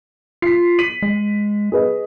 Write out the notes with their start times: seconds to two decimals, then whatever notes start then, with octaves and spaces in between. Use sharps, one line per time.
0.42 F4 B6 C7
0.79 B6 D#7 F#7
1.02 G#3
1.72 G#4 B4 D#5